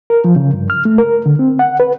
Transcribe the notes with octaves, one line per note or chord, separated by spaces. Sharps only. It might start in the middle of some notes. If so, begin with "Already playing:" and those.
A#4
F3
C#3
G2
F6
A3
A#4
D3
C4
F#5
B4